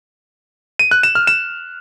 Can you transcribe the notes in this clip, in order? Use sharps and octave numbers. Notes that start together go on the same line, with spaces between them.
D#7
F#6
E7
F6
E7